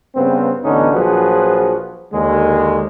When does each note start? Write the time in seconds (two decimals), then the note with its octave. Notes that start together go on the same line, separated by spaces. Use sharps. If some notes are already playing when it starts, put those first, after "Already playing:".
0.15 G2 C#3 B3 C4
0.63 A1 D3 B3 C#4 D#4
0.92 A#1 F3 F#3 F#4 G#4 B4
2.12 D#2 D3 G#3